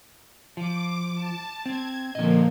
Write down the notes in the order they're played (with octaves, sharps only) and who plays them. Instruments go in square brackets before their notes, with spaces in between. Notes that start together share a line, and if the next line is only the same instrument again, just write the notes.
[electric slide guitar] F3 [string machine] D6
[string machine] A5
[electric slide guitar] C4 [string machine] G#6
[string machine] A#2 F3 A#3 [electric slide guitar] D3 D#5